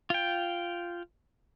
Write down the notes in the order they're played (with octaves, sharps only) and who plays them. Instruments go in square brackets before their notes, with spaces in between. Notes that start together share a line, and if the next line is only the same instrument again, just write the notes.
[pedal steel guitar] F4 G5